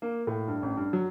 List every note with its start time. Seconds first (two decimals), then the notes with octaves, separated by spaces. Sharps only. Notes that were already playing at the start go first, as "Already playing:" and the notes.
0.02 A#3
0.27 A2
0.48 G2
0.63 A1
0.77 G2
0.93 F#3